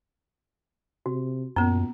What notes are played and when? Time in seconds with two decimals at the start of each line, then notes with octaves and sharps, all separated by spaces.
1.06 C3 F#4
1.56 F#2 A#2 B3 C#4 A#5